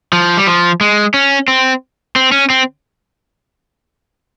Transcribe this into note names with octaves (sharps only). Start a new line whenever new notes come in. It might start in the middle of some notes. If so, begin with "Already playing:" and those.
F3
G3
F3
G#3
C#4
C4
C4
C#4
C4